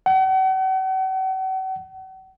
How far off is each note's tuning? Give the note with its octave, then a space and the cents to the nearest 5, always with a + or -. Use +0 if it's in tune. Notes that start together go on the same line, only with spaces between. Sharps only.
F#5 +40